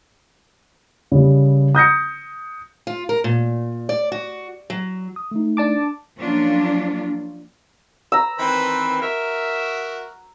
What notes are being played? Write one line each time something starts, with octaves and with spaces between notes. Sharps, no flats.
C#3 G3
D#6 G6 A#6 C#7
F4
A#4
A#2
D5
F#4
F#3
D#6
A3 D#4
D4 A5 D6
F3 F#3 A#3 C#4 D4 F4
A#5 E6
D#3 E3 C4 B4 C5 B5
F#4 A#4 E5